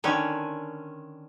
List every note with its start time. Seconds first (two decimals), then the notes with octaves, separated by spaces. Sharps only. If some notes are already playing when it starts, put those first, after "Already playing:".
0.04 D3 D#3 C#4